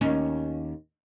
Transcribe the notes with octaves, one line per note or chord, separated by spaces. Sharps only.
D#2 C#4